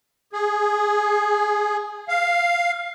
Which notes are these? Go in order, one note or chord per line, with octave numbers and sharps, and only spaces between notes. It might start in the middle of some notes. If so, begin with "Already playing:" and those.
G#4
F5